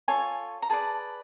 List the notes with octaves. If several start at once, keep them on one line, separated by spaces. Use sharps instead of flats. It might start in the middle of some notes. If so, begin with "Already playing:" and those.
F4 A4 C#5 G#5
A#5
G#4 B4 D5 A5